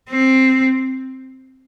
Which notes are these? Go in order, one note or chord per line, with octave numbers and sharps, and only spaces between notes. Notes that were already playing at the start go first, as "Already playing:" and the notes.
C4